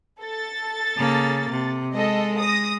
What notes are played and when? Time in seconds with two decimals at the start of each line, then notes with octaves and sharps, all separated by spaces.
0.21 A4 A6
0.97 C#3 A#3
1.50 C3
1.93 G#3 A4 D#5
2.39 D#6 A#6